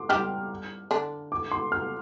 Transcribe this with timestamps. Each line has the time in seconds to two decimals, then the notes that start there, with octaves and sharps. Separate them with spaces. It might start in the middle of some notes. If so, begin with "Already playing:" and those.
Already playing: C6 D6
0.09 G3 G4 F6
0.91 D3 D4
1.32 D6
1.52 C6
1.72 F6